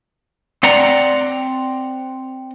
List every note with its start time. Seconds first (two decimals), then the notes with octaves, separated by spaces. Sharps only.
0.63 C4 D5 F#5 A#5